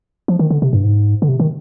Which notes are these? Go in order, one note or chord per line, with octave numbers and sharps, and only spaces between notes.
F3
D#3
D3
C3
G2
G#2
D3
C3
D#3